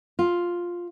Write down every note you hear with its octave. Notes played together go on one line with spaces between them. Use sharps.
F4